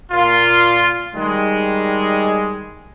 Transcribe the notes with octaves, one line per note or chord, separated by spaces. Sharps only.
A#2 F4
D#3 G3 G#3